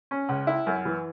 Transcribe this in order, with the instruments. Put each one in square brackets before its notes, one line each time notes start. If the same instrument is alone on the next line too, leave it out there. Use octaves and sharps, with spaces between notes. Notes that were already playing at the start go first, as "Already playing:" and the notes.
[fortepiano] C#4
C#2
E4
F#2
E3